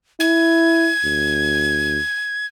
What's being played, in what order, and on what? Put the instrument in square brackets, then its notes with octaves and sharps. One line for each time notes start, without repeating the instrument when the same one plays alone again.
[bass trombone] E4 [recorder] G#6
[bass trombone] D2